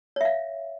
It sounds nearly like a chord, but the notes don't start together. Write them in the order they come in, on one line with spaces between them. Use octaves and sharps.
C#5 E5 F5